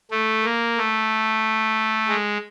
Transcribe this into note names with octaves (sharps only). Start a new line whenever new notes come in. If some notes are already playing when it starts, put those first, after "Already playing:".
A3
A#3
A3
G#3